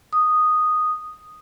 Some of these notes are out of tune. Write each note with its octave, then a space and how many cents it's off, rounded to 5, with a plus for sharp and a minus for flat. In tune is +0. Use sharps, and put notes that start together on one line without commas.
D#6 -5